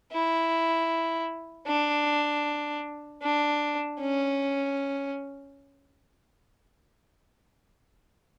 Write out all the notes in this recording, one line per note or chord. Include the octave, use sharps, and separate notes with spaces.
E4
D4
D4
C#4